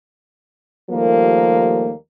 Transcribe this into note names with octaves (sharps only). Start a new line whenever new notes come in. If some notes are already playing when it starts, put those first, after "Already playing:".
D#2 F3 G3 A3 A#3